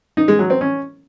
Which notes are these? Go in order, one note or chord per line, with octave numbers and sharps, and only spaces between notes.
D#4
G#3
F#3
C4
C#4